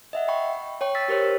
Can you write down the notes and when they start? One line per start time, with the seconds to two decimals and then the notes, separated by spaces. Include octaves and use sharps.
0.13 D#5 E5 F#5
0.28 G5 B5 C#6
0.81 C#5 G5 C#6
0.95 E6 A6 B6
1.08 G4 A#4 C5 C#5